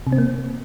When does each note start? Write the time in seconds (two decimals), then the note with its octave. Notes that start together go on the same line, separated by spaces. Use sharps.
0.07 C3
0.12 C4
0.18 A#3